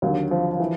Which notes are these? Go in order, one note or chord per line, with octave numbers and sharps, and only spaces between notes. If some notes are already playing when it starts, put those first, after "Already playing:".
D#2 D3 F#3
F3
E3